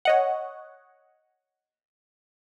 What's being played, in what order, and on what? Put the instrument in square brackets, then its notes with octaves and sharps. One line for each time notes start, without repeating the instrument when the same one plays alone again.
[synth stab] C#5 D#5 F#5